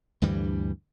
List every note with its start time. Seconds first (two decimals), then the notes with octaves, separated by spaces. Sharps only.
0.22 D2 G2 E3 G3